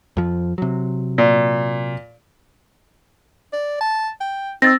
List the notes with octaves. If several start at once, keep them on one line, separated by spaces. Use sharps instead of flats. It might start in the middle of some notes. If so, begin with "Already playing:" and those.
F2 F3
C3 F#3
A#2
D5
A5
G5
C4 D#4 E6 A6 A#6